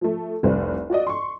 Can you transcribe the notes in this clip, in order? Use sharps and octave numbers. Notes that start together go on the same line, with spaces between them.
F3 A3
F1 C2 C3 G3 C5 D5
F4 F#4 D5 D#5
C6 C#6